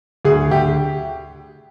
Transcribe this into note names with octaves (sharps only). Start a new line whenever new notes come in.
D2 G#4
D2 G4